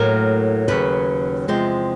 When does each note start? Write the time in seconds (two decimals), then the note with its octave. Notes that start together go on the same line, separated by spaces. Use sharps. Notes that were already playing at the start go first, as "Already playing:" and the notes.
Already playing: A2 F#3 A#3 A#4
0.68 D#2 C#3 F#3 B4
1.48 E2 C3 F3 G#3 C5